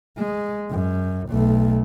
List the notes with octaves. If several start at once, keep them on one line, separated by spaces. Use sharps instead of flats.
G#3
F#2
B1 A3